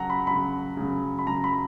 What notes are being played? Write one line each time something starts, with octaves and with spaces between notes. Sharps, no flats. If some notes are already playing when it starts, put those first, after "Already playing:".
Already playing: C#3 F#3 F#5 A#5
B5
C#3 F#3 B5
C#3 F#3
B5
C#3 F#3 A#5
B5